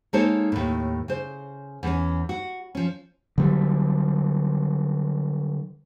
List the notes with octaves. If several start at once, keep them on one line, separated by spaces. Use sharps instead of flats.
G#3 A#3 D#4 A4 C5 C#5
D#2 A2
C#3 C5
E2 C#4
F#4
F3 C#4
D3 F#3 G3